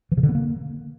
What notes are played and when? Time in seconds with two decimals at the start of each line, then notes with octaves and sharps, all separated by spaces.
0.12 E3
0.17 C#3
0.23 D3
0.29 B3
0.35 A#3